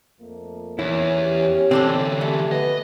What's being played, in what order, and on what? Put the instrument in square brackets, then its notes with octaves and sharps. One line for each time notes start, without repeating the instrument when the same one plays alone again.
[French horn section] F2 A3 A#3
[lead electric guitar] E2 [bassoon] C#4 [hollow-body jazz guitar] E4
[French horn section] G4
[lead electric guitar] D3 E3 [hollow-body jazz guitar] C4 D4 A4
[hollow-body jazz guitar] A3 [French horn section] G4
[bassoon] B3 [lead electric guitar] D#5